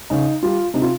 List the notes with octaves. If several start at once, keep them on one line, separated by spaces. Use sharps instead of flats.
C#3 D#4
G3 F4
C3 D#4
F4